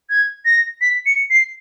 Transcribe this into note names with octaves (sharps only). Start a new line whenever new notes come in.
G#6
A#6
B6
C#7
C7